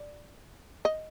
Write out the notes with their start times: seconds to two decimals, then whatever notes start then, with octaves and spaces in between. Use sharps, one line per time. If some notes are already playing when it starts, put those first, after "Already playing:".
Already playing: D5
0.85 D#5